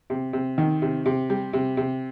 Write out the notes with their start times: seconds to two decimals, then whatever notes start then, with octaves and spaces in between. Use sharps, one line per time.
0.10 C3
0.33 C3
0.58 D#3
0.82 C3
1.06 C3
1.30 G3
1.53 C3
1.77 C3